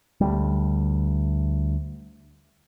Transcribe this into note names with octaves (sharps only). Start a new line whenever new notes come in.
D2 G3